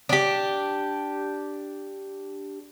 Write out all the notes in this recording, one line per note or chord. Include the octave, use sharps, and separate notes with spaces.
D4 G4